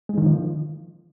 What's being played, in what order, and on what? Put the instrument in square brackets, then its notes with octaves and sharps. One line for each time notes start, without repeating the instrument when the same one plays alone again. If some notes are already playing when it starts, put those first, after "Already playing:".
[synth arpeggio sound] G#3
D#3
F3